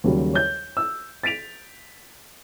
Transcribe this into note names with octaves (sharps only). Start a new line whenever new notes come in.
D#2 C#3 F#3 G3
C#5 G6
E6
A6 B6 D7 F7